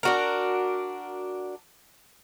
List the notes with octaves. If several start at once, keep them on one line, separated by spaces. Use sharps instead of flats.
D4 F#4 A#4